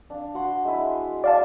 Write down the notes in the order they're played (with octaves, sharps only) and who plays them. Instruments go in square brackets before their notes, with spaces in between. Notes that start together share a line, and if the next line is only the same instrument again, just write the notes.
[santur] D4 F5
F#4 F#5 C6
G#3 E4
[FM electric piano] D5 F5 A5 [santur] G#5